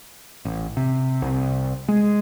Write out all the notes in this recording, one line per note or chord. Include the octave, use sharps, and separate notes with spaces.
A1
C3
C2
G#3